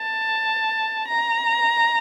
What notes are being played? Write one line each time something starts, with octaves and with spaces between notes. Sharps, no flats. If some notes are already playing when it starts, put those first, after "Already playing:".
Already playing: A5
A#5